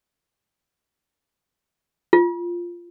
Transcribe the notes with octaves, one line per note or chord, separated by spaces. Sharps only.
F4